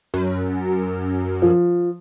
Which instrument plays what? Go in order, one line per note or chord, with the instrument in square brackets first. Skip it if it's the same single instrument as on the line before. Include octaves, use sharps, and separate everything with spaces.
[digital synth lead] F#2
[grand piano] F3